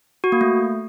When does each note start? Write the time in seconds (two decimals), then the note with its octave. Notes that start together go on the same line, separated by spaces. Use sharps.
0.24 F#4
0.32 A#3
0.41 A3